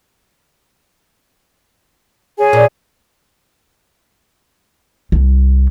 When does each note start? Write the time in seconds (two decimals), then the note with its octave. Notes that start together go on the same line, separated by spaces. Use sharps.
2.38 G#4 C#5 G#5
2.53 A#2
5.12 C2